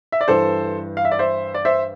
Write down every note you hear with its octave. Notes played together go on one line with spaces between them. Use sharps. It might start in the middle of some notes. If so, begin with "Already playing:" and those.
E5
D5
G2 E3 A4 C5
F5
E5
D5
C5 E5
D5
C5 E5